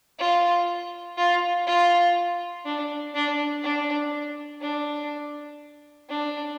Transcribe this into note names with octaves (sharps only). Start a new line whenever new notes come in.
F4
F4
F4
D4
D4
D4
D4
D4